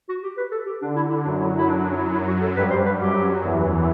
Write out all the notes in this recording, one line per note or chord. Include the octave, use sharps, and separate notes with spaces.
F#4
G4
B4
A4
G4
D3 D4
E4
E4
F#2 F#3 D4
E4
E4
D4
D4
E4
E4
F#4
A4
G2 G3 B4
C5
B4
F#2 F#3 G4
E2 E3